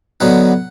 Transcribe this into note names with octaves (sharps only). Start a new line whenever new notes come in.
D3 F#3 B3 D#4 F#5